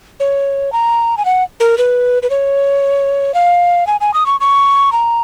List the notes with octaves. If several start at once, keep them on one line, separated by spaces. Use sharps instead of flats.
C#5
A#5
G#5
F#5
A#4
B4
B4
C#5
F5
G#5
G#5
D#6
C#6
C#6
A#5